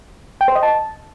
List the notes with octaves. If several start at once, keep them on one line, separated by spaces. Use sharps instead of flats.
G5
C5
D#5
A5